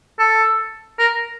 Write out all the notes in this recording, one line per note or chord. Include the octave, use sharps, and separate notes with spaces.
A4
A#4